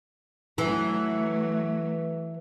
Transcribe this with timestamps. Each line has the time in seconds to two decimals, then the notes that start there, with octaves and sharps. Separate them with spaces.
0.58 E3 F#3 A3 E4